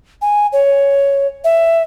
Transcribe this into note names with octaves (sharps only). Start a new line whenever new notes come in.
G#5
C#5
E5